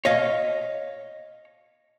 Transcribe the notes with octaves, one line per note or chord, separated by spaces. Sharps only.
C#5 D#5 F5